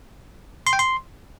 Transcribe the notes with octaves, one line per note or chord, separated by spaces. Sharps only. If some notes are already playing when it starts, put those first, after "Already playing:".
C6
G5
C6